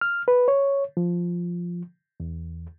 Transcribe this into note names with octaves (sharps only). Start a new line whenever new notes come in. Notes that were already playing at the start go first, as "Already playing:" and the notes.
F6
B4
C#5
F3
E2